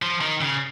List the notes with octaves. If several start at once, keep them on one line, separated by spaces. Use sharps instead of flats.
F3
D#3
C#3